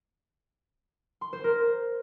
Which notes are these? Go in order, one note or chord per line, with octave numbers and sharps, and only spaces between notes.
C6
C5
A#4